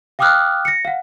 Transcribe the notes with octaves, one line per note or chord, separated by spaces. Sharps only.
F5 G5 D6 D#6 F6 F#6
A#6 C#7
F5 F#5